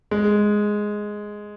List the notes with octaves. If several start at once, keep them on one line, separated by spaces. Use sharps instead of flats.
G#3